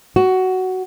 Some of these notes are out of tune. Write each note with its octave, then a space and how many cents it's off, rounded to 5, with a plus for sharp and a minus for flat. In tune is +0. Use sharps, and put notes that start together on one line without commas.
F#4 +10